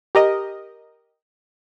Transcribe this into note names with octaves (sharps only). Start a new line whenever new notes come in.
G4 A#4 D#5